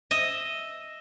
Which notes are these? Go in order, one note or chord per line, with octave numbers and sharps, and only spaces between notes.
D#5 E5